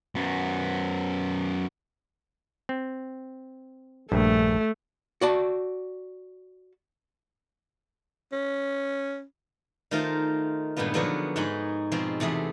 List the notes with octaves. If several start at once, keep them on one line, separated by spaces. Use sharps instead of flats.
F#2 B3
C4
A#1 G2 A3
F#4 D5 A5
C#4
D#3 A3 D#4 F4 A#4 C5
G2 A#2 D#3 G#3 B3 F4
D3 F3 F#3 B3 F#4 G#4
G#2 G#3 D#4 F#5 B5
B2 F3 G#3 C4
E2 C3 A3 G#4 B5